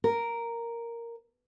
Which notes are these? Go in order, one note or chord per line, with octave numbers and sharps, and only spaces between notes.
A#4